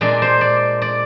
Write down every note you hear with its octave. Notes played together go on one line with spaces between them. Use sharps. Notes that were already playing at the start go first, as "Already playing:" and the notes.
A#2 G#3 D4 D5
C5
D5
D5